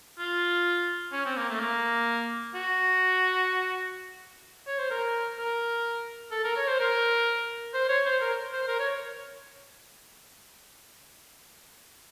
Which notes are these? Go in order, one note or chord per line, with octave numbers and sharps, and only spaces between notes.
F4
C#4
C4
A#3
A3
A#3
F#4
C#5
C5
A#4
A#4
A4
A#4
C#5
C5
A#4
C5
C#5
C5
A#4
C5
A#4
C#5